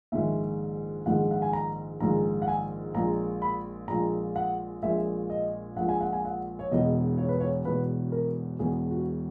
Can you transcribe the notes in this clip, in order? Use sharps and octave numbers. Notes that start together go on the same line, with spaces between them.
A#1 G#2 D#3 G#3 E5
A#1 G#2 D#3 G#3 F#5
F#5
G#5
A#5
A#1 G#2 D#3 G#3 A#5
F#5
G#5
A#1 A#2 G#3 A#5
B5
A#1 A#2 G#3 A#5
F#5
A#1 A#2 G#3 E5
D#5
A#1 A#2 G#3 F#5
G#5
F#5
G#5
F#5
C#5
E1 E2 B2 D#5
C#5
B4
C#5
E1 E2 B2 B4
A#4
E1 E2 B2 G#4
F#4